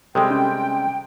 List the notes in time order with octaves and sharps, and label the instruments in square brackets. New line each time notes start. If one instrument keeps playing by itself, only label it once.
[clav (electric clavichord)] C3 G3 G#3 [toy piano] A4 [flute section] G5
[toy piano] C#4